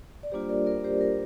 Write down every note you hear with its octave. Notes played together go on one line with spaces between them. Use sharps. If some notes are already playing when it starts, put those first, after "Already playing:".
D5
G3 A#3 D4 F4 G4 C5
A#4 D5
A#4 D5
G4 C5
A#4